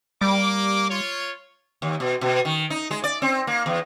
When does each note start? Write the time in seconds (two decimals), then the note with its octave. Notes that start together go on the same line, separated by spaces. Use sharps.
0.21 G3 A#3 D6
0.90 F4 C#5
1.82 D#2
2.00 B2
2.21 B2
2.45 D#3
2.70 D#4
2.91 G#3
3.04 D5
3.22 C4
3.47 A#3
3.66 E2